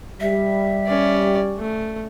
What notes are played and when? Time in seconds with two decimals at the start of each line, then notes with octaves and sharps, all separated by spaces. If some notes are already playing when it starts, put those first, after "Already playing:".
0.20 G3 E5
0.87 C#4 D5
1.58 A3